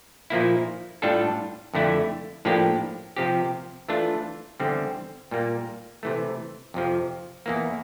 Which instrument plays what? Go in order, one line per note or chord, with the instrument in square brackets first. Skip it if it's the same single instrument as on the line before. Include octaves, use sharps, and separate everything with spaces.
[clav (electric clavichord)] A#2 F3 A#3 E4
A2 G3 D4 F4 A4
F2 D3 A3 E4
A2 F3 A#3 D4 G4
C3 F3 C4 G4
E3 A3 D4 F4
E2 D3 G3 C4
A#2 G3 A#3
C3 E3 A3
F2 C3 F3
E2 E3 A#3